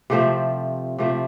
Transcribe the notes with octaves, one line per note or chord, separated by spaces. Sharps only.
C3 F3 A3 C4
C3 F3 A3 C4